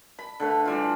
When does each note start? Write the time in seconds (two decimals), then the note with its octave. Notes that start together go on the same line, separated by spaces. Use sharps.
0.19 B5
0.40 D3 A3 B4
0.65 E3 G3 F4